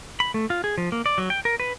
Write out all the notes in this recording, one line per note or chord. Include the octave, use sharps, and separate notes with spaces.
B5
A3
F4
G#4
F3
A#3
D5
F#3
G5
A#4
B4